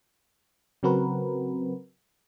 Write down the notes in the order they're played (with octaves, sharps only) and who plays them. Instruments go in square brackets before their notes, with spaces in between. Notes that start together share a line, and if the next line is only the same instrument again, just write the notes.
[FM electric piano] C#3 F#3 C4 F#4 A#4 B4